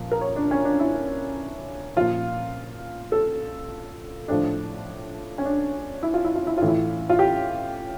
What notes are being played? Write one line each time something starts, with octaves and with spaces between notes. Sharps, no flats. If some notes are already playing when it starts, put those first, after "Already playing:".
Already playing: A#2 F3
A#4
C#5
D4
C#4
D4
E4
A#2 F3 F4
A4
A2 F3 D4
C#4
D4
E4
F4
E4
F4
E4
A2 E3 F4
E4
F4
G4